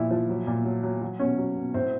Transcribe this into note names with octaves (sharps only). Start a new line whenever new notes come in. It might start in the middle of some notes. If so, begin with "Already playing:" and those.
Already playing: A#2 F3 E4
F3
F#3
A#2
F#3
F#3
F#3
B2 C#4
F#3
B2
A2 C4